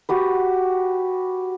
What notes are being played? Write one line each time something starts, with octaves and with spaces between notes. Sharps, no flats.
F#4 G4 B4